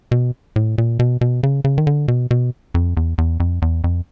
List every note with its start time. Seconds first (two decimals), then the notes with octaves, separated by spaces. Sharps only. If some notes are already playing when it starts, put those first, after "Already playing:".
0.11 B2
0.56 A2
0.78 A#2
0.99 B2
1.21 B2
1.43 C#3
1.64 C#3
1.78 D#3
1.87 D3
2.08 B2
2.31 B2
2.74 F2
2.97 E2
3.18 E2
3.40 F2
3.62 E2
3.84 F2